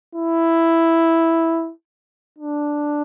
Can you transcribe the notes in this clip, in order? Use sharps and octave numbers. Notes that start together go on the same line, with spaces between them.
E4
D4